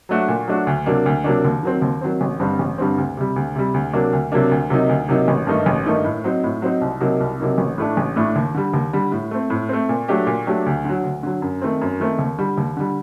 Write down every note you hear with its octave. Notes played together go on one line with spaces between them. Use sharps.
F#3 A3 D4 F#4
A#2
F#3 A3 D4 F#4
D2
C3 F#3 A#3 D4
D2
C3 F#3 A#3 D4
D#2
D#3 F#3 C4
D#2
D#3 F#3 C4
A1
G2 D3 G3 C4
A1
G2 D3 G3 C4
D2
C3 G3
D2
C3 G3
D2
C3 F#3 A#3 D4
D2
C3 F#3 A#3 D4
D2
C3 F#3 A#3 D#4
D2
C3 F#3 A#3 D#4
A1
G2 D#3 A3 D#4
A1
G2 D#3 A3 D#4
A2
F#3 C4 D#4
A2
F#3 C4 D#4
C2
C3 F#3 A#3 D#4
C2
C3 F#3 A#3 D#4
A1
A2 A3 D4
A1
A2 A3 D4
D#2
D3 G3
D#2
D3 G3
A2
A3 C4
A2
A3 C4
A#2
F#3 A3 D4 G4
A#2
F#3 A3 D4 G4
D2
D3 F#3
D2
D3 F#3
F#2
D#3 A3 C4
F#2
D#3 A3 C4
D#2
D3 G3
D#2
D3 G3